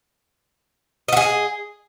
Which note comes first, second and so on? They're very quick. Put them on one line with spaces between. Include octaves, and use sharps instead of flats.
D#5 F#4 G#4